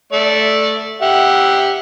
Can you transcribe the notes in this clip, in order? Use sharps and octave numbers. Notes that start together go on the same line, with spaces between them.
A3 D5
G4 E5 F#5